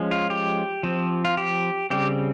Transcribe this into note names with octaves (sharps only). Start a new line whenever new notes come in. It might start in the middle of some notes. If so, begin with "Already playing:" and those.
Already playing: F3 G#3 C#4
F4
G4
F3 C4
F4
G4
C#3 G3 C4 G4